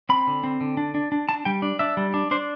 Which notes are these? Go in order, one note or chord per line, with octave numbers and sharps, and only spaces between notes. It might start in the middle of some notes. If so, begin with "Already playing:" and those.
C4 B5
D3
C4
D3
D4
D4
D4
D4 A5
G3 G5
D4
D4 E5
G3
D4
D4 C5